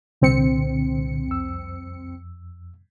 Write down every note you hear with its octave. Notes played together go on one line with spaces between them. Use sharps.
C2 A#2 D3 C4 C#7
F2 E6